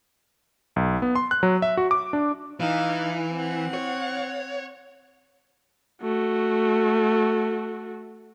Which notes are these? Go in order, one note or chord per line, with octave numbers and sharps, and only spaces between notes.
B1
B3
C6
F#6
F#3
E5
F#4
D6
D4
E3 D#4 F5
C4 F#5
C#5
A3 F#4